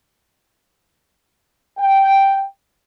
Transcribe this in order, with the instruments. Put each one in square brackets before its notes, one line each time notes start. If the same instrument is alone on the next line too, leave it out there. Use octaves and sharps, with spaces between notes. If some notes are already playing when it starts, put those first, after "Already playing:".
[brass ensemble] G5